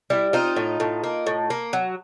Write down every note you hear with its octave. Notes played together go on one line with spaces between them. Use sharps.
G3 E4
C4 D#4 F4
A2
A2
A#3
A2
A#3
F#3